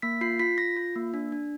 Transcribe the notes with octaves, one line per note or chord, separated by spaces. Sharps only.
A#3 B6
F4 C7
F4 B6
F4 A#6
F4
A#3
D4
D4